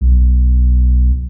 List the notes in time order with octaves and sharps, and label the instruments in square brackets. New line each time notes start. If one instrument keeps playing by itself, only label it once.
[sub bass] B1